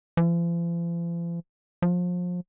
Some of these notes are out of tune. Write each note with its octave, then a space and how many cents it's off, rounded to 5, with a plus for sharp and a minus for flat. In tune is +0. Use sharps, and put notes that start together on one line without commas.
F3 -45
F3 +30